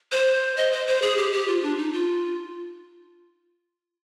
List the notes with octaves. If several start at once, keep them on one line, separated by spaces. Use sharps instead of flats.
C5
D#5
C5
C5
G#4
G4
G4
F4
D4
D#4
F4